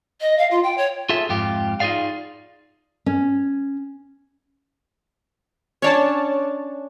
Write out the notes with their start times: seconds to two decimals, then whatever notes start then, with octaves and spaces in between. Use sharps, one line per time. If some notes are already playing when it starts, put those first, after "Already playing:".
0.20 D#5
0.38 F5
0.51 F4
0.63 G5
0.77 C#5
1.09 F4 G#4 A4 E5
1.29 F2 G#2 F4 G4
1.80 D#4 F4 G#4 D5 F5
3.06 C#4
5.82 C#4 D4 C#5 D5 A5